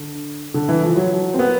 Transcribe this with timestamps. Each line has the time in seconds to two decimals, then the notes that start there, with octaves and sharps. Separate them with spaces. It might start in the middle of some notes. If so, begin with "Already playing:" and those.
Already playing: D3
0.54 D3
0.68 E3
0.83 F3
0.97 F#3
1.34 C4
1.39 B3